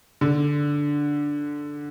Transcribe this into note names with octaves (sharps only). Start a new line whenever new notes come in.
D3